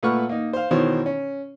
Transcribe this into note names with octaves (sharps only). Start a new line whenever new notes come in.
A#2 A3 B4 F#5 C#6 F6
A#3 D#4
C5 F5
B2 D#3 E3 C5 C#5
C#4